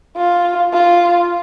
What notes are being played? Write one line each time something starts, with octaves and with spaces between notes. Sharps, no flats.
F4
F4